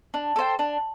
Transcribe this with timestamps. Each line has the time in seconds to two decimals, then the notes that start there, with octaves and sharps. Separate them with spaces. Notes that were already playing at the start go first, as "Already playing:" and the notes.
0.14 D4
0.36 A4 C5 G5
0.59 D4